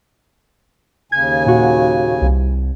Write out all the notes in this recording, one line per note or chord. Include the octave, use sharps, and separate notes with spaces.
D#2 C#3 G#5 G#6
A#2 F#4
C2